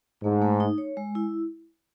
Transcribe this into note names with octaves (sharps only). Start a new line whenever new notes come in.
G#2 A3
A3
D#4
C#5
G#3
E4